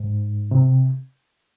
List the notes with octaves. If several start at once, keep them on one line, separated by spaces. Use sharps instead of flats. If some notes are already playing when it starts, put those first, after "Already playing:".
Already playing: G#2
C3